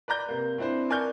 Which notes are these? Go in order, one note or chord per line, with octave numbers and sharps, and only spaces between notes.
B4 D5 A#5 G6
C3 A#3
C4 D4 E4 B4 C5
A#4 D5 G#5 C#6 F6 G6